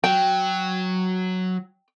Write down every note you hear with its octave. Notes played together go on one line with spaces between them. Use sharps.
F#3 G5